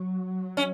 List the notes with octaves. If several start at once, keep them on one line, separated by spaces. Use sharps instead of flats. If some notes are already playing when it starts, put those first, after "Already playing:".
Already playing: F#3
C#4